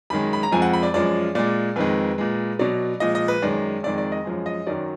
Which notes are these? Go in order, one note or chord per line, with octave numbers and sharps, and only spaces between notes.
F#2 D#3 G#3 B5
B5
A#5
F2 F3 G#3 G#5
F#5
B5
D5
F#2 F3 G#3 D5
A#2 G#3 D5
F2 D#3 G#3 B4
A#2 G#3
B2 F#3 D5
A#2 F3 G#3 D#5
D#5
B4
F#2 D#3 G#3 D5
F2 D#3 G#3 D5
D5
D#5
F#2 F3 G#3
D#5
F#2 D#3 F#3 D5